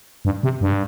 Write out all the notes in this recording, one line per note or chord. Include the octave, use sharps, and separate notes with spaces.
G2
C3
G2